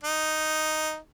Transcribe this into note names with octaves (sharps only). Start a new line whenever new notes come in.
D#4